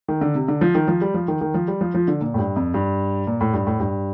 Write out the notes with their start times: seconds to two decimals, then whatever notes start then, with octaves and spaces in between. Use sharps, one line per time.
0.08 D#3
0.21 D3
0.35 C3
0.48 D3
0.61 F3
0.75 D#3
0.88 F3
1.01 G3
1.14 F3
1.28 D#3
1.41 D#3
1.54 F3
1.68 G3
1.81 F3
1.95 F3
2.08 D3
2.21 A#2
2.34 A2
2.38 G2
2.56 F2
2.74 G2
3.27 A#2
3.41 A2
3.53 G2
3.67 A2
3.80 G2